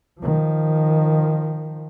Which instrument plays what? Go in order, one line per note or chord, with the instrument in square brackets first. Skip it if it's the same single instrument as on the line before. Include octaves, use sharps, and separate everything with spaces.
[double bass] D#3 F3